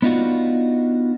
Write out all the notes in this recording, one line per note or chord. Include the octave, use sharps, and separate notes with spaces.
B3 D4 D#4 F4 F#4